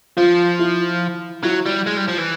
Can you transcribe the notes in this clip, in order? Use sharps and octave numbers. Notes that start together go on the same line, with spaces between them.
F3 F4
E4
F#3 E4
G3
G#3
G3
F3
E3